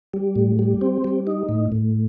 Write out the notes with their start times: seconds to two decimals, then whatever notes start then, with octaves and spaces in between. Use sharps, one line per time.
0.14 G3
0.36 A2
0.59 G3
0.81 C4
1.04 G3
1.27 D#4
1.49 A2
1.72 A2